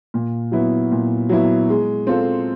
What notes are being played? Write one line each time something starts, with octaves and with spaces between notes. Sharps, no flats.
A#2
F#3 B3 E4
A#2
F#3 B3 E4
G#3
C4 F4 A4